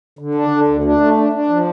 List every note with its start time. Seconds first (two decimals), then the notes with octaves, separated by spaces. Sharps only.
0.19 D3
0.34 D4
0.51 D3
0.68 D2
0.84 D4
1.00 A3
1.17 D4
1.32 D4
1.50 F3